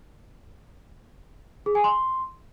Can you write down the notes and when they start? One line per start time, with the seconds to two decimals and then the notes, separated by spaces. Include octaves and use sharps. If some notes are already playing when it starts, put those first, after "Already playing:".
1.66 G#4
1.75 G#5
1.84 C6